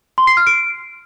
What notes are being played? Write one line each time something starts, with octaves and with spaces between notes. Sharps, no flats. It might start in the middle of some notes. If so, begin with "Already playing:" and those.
C6
C7
F6
D7